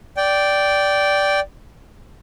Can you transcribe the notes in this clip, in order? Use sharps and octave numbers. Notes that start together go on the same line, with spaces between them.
D5 G5